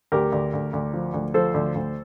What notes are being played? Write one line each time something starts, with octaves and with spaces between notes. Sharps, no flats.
D2 G4 A#4
D2
D2
D2
F3
D2
F3 A4 C5
D2
D2